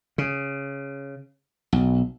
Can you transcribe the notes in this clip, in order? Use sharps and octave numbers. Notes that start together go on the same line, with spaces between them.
C#3
B1